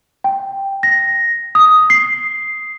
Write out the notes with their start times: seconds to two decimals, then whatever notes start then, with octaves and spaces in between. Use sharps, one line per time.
0.24 G5
0.83 A#6
1.55 D#6
1.90 C7